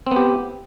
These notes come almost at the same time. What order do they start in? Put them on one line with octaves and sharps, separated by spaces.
C4 B3 G4